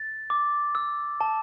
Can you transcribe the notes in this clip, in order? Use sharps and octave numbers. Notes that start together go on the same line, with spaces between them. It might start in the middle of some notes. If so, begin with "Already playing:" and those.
Already playing: A6
D6
E6
A5